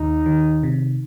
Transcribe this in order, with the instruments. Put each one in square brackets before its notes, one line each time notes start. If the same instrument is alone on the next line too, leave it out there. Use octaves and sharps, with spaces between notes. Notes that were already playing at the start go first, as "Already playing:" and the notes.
Already playing: [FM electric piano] D#2 [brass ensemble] D#4
[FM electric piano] D#3
C3